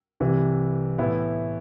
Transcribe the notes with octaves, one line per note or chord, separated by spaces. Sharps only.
C2 C3 E3
A2 E3 B3 E4